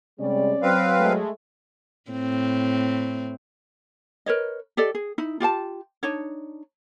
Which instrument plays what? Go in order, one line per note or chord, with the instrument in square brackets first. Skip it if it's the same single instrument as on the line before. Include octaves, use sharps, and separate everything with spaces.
[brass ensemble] C3 G3 G#3 [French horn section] C#4 D5
[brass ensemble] F#3 [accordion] C4 B4 F5
[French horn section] G#3 A3
[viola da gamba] A2 C4
[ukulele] A#4 B4 C#5 D#5
G4 A4 D5 D#5
G#4
D#4 E4
F4 G4 F#5 A5
D4 D#4 C#5